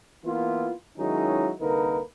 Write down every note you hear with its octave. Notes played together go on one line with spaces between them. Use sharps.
E3 A#3 B3 E4 F4
D#3 F#3 G#3 C#4 D#4 E4
C2 D3 A#3 D#4 A#4 B4